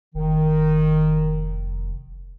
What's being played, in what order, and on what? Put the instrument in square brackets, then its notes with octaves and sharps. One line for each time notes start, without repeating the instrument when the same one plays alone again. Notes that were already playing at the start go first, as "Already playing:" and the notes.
[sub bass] F1 [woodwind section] D#3